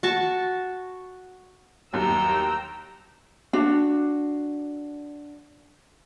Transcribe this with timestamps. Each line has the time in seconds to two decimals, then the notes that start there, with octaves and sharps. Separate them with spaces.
0.03 F#4 A5 C#6
1.93 G1 D#2 F#3 G5 A#5 E6
3.53 D4 F#4